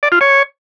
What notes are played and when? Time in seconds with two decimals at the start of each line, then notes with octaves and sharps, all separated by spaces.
0.03 D5
0.12 F4
0.21 C#5